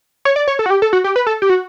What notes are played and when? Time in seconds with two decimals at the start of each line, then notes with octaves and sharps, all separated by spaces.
0.25 C#5
0.36 D5
0.48 C#5
0.59 A4
0.66 F#4
0.70 G4
0.82 A4
0.93 F#4
1.04 G4
1.16 B4
1.27 A4
1.42 G4
1.50 F#4